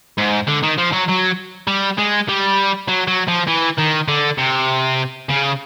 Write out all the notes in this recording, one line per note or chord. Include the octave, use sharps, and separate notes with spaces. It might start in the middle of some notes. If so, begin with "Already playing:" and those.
G#2
D3
D#3
F3
F#3
F#3
G3
G#3
G3
F#3
F#3
F3
E3
D#3
D3
C3
C#3